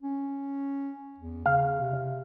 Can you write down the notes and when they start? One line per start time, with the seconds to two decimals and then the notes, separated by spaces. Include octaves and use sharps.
0.02 C#4
1.18 E2
1.46 C#3 F5
1.81 C3